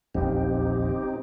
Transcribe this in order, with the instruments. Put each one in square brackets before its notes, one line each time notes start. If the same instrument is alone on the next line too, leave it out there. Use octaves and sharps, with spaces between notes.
[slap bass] D#1 A#1 E2 [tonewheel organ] C4 D#4 G4